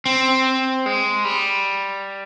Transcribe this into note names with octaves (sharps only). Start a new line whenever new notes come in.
C4
G#3
G3